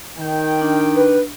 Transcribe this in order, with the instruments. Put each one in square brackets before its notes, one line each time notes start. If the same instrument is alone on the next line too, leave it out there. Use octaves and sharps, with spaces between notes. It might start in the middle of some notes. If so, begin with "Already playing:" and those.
[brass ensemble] D#3 G5
[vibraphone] D4
[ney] B4